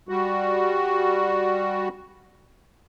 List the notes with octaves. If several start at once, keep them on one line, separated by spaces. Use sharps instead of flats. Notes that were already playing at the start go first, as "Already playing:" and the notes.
G3 F#4